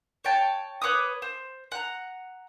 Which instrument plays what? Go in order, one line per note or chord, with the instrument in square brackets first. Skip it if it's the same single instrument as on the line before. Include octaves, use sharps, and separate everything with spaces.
[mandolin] C#5 G5 A5
B4 C#5 D6 D#6
C5
F#5 A#5